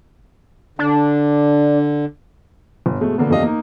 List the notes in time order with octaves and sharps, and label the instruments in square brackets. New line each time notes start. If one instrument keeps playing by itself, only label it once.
[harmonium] D3 [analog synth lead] D4
[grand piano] G1
B2 G#3 A3
B2 D3 A#3 B3
F2 A3 D4 G4 D#5 F5
A#3 D#4